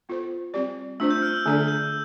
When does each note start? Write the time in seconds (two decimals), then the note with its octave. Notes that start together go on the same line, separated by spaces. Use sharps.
0.09 B3 F4 A4 C5
0.54 G3 C4 G4 D5
1.00 A3 D4 F4 C5 E6
1.11 G6
1.22 F6
1.34 E6
1.46 D3 A3 D4 A4 D5
1.68 G6